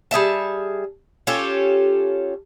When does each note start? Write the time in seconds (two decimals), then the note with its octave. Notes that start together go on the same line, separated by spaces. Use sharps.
0.11 G3 G#4 E5 A5
1.27 C#4 F4 G4 A4